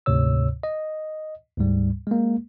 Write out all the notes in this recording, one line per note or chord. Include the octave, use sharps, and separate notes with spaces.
D2 G#2 C3 C#5 E6
D#5
D2 G#2 G3
G#3 A#3